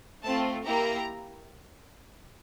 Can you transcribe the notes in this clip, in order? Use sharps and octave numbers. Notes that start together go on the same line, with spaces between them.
A3 C4 F4 A5
A#3 E4 G4 A#5